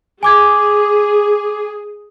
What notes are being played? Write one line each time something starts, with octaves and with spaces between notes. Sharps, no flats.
G#4 G#5 D6 G#6